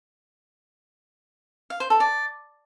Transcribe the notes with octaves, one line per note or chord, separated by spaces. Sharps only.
F5
C5
A4
D5